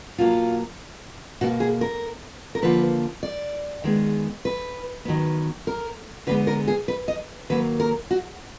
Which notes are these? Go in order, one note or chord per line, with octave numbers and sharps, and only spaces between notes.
B2 F#3 A#3 F4
B2 A#3 F#4
G#4
A#4
A#4
D3 F3 A#3 B4
D5
D#3 G#3 B3
B4
D#3 F#3 B3
A#4
D3 G#3 B3 B4
A#4
G#4
B4
D#5
D#3 F#3 A#3 B4
A#4
F#4